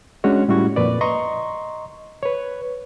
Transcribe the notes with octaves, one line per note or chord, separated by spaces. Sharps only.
G#3 C#4 D4 F#4 C#5
A2 G3 C#4 E4 F#4 C#6
F2 A#2 B4 D5
D#5 A#5 C6 C#6
B4 C#5